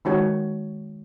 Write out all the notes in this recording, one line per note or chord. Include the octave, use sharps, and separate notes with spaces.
D#3 G#3 D#4 F#4 C#5